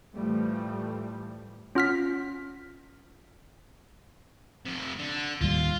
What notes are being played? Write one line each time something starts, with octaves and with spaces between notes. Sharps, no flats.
A2 E3 F3 G3 A3
C#4 F4 F#5 F6 A#6 B6
F2 C3
D3
D1 D#2 G3 F4